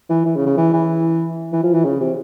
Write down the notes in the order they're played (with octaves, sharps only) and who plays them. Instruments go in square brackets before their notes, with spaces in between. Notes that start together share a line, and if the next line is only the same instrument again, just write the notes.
[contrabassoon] E3
E3
C#3
C#3
E3
E3
E3
F3
E3
C#3
C3